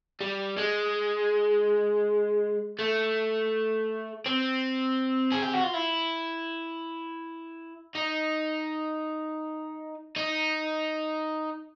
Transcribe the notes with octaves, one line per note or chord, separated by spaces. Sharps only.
G3
G#3
A3
C4
G#4
G4
F#4
F4
E4
D#4
D#4